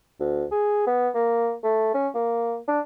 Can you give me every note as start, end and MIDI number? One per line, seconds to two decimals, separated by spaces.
0.20 0.44 38
0.51 0.83 68
0.87 1.09 59
1.15 1.52 58
1.64 1.92 57
1.94 2.08 61
2.14 2.56 58
2.68 2.80 62